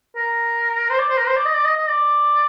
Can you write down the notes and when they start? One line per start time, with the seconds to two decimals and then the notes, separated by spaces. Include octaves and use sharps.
0.16 A#4
0.90 C5
0.99 D5
1.09 C5
1.17 A#4
1.27 C5
1.36 D5
1.46 D#5
1.54 D5
1.65 D#5
1.77 D#5
1.88 D5